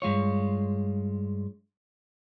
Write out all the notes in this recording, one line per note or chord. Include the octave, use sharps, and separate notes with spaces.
G2 G#3 F4 C#5